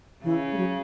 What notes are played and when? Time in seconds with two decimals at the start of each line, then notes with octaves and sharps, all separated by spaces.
0.24 C#3 E3
0.52 G#3
0.57 F#3